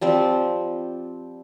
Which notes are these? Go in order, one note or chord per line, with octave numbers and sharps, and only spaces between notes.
F3 G3 C4